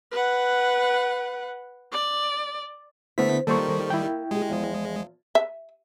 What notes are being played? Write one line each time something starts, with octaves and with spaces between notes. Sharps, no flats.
B4 F#5
D5
D3 A3 B3 E4 C5 B6
D#3 G3 A#3 F4 A4 A#4 C5 C#6
E4 G5
G#3 G4 G#4
E2 F3
E5